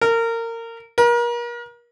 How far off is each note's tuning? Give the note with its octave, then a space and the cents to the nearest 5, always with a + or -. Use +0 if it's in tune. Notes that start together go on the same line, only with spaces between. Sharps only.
A#4 -25
A#4 +35